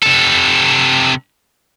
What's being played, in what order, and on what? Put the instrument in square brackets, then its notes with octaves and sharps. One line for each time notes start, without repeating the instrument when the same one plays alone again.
[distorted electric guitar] C3 A4